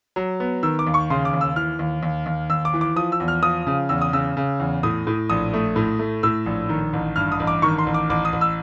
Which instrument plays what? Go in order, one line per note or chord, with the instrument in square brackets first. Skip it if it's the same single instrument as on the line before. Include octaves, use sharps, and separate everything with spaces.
[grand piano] F#3
B3
D#3 E6
D6
D#2
C#6
C#3 C6
D6
D#2
E6
E3 F6
D#2
D#2
D#2
D#2 E6
D6
E3
D6
F3 D#6
E6
E2
F6
F3 D#6
C#3
E2 E6
D#6
C#3 E6
C#3
E2
A2 D#6
A2
A#1 D#6
A3
A2
A3
A2 E6
A#1
D#3
A1
G2 F6
D#6
A1
D6
D#3 C#6
C6
A1
D6
A1 D6
D#6
A1
E6